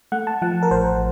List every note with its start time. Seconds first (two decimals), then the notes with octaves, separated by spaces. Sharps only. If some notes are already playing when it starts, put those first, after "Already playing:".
0.12 A3 F#5
0.27 A5
0.42 F3 F#5
0.63 A#4
0.71 A1 C5